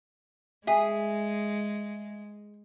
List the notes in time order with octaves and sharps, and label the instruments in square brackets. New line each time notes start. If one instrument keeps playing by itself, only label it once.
[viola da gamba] G#3 [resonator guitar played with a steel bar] G#4 [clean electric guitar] E5